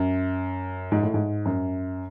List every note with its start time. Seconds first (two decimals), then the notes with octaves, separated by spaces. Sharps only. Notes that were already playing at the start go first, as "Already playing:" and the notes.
Already playing: F#2
0.92 G#2
1.03 A2
1.14 G#2
1.45 F#2